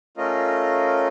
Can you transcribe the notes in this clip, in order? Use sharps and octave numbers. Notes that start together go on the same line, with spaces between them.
A3 C#4 F4 A#4 D#5